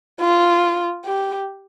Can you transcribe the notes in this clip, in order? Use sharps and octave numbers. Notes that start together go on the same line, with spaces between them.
F4
G4